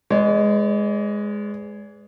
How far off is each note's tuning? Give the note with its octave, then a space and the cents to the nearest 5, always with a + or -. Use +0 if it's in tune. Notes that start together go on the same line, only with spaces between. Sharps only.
G#3 +0 B4 +30 D5 -45